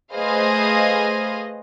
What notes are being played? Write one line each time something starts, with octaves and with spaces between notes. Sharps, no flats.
A3 G#4 B4 C5 D#5 F5